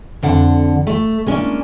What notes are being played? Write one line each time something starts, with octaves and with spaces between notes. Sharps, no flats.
F2 D3 F#5
A3
G#3 A#3 C#4 D4